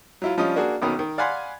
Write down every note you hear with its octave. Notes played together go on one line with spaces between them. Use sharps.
F#3 E4 F4
F3 G3 C#4 D4 F4 D#5
A#3 D4 F#4 G#4
B1 B2 D#3 C#4
D#3
D5 F5 F#5 G#5 B5 C6